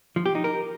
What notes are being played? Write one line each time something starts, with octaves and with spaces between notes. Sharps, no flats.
F3
G4
D#4
A#4